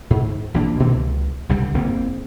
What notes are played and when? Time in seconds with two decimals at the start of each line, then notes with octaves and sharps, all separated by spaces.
0.10 G#2
0.54 A#1 E3 A#3 D4
0.80 B2 D#3 E3 A#3
0.93 C#2
1.49 C2 G2 D3 G3
1.74 F#1 E2 A#3 C4